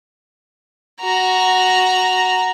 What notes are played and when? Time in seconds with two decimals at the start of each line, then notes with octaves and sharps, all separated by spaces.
1.01 F#4 A#5